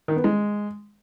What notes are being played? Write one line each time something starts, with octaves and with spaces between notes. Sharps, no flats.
D#3
B3
G#3